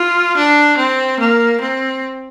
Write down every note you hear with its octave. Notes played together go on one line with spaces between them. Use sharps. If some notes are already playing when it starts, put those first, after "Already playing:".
Already playing: F4
D4
C4
A#3
C4